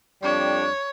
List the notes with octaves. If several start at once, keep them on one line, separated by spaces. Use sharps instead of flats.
F2 G3 D4 C#5